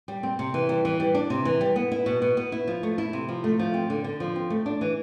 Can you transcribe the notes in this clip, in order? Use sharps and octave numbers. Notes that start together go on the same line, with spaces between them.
G3
C4
C3
E3
G3
E3
G3
D4
C3
E3
G3
B3
E4
B2
B2
B3
E4
F3
A3
E4
C3
F3
A3
F3
C4
D3
D3
F3
C4
A3
D4
E3